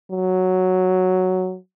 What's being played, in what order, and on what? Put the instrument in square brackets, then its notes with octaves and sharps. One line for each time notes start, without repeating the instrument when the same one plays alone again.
[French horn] F#3